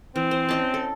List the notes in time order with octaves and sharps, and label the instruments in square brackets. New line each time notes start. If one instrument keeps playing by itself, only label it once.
[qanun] E3 [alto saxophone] C4
[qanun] C5
C#4 D#5 A5
A4